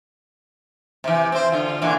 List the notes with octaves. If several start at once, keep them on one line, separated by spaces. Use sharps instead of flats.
C3 E3
C4 C5
D3 F4
A#2 D3 E3